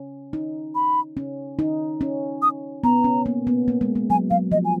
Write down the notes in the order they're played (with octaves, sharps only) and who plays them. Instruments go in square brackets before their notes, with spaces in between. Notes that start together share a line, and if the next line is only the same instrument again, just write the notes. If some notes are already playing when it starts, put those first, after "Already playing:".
Already playing: [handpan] C#4
D#4
[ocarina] B5
[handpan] C#4
D#4
C#4
[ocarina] D#6
[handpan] B3 [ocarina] A#5
[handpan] C#4
A#3
B3
A#3
G#3
G#3
[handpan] F#3 [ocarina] G#5
[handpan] F#3 [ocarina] F5
[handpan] F3 [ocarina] D#5
[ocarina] G#5